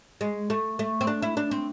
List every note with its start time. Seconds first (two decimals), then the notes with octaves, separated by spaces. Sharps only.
0.21 G#3
0.50 A3
0.79 A3
1.01 C4
1.07 D4
1.22 E4
1.37 D4
1.51 C4